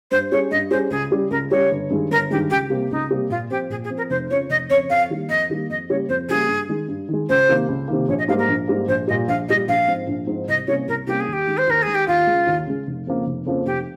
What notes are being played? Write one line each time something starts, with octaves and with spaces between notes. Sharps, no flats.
G2 C5
G3 C#4 G#4 C#5
G2 D#5
G3 C#4 G#4 C5
C#2 G#4
C#3 G3
C#2 A#4
C#3 G3 C#5
G1
G2 D#3 G#3
G1 A#4
G2 D#3 G#3 G4
C#2 G4
C3 G3 A#3
C#2 D#4
C3 G3 A#3
A#2 F4
F3 C4 G4
A#2 G#4
G#4
F3 C4
A#4
F1 C5
F2 C#3 F3 C#5
F1 D#5
F2 C#3 F3 C#5
F2 F5
D#3 G3 A#3
F2 D#5
D#3 G3 A#3
F2 D#5
C#3 G3 A#3 C#5
F2 C5
C#3 G3 A#3 G#4
G2
D#3 G#3
G2
D#3 G#3
C#2 C5
C3 D#3 A#3
C#2
C3 D#3 A#3
A#1 C#5
D#5
G#2 G3 A#3 F5
A#4
A#1
G#2 G3 A#3
A#1 C5
A#2 G3 D#5
A#1 F5
A#2 G3 D#5
A#1 F5
G#2 F3 C4 D#4
A#1
G#2 F3 C4 D#4
C2 D#5
C3 G3 A#3 C#4 C#5
C2 A#4
C3 G3 A#3 C#4 G4
G#4
D#2
G4
D#3 G#3
C5
D#2 A#4
D#3 G#3 G#4
G4
D#2 F4
C#3 G#3
D#2
C#3 G#3
F1
F2 C#3 F3 A#3
F1
F2 C#3 F3 A#3
F1 G4